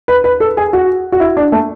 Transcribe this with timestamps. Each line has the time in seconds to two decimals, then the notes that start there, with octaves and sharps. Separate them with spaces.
0.08 B4
0.24 B4
0.40 A4
0.57 G#4
0.73 F#4
1.12 F#4
1.20 E4
1.37 D4
1.52 A3